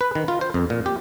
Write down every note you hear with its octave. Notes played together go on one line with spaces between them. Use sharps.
B4
D#3
F4
C5
F2
A#2
G4